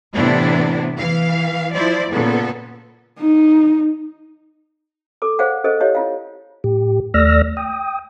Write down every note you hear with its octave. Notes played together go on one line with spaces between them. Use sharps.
A2 C3 E3 B3 D4 E4
E3 F5
F3 E4 C5 D5
A#2 C#3 B3 A4
D#4
A4 D6
G#4 C5 D5 F5 F#5
G#4 A4 C5 D#5
E4 G4 C#5 D#5 F5
E4 F4 F5
A2 G4
D#2 A3 D5 E6 F6 A#6
G5 D#6